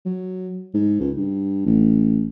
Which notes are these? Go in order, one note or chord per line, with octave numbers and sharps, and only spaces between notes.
F#3
G#2
C#2
G2
A1